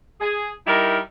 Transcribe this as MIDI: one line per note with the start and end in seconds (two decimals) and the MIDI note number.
0.21 0.49 68
0.67 0.98 55
0.67 0.98 63
0.67 0.98 64
0.67 0.98 70